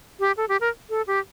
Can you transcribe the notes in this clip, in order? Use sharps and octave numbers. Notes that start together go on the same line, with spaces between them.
G4
A4
G4
A#4
A4
G4